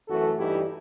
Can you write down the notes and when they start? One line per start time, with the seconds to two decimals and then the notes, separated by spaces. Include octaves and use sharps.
0.08 F#2 E3 A3 F#4 A4
0.38 G2 E3 G3 D#4 E4 G4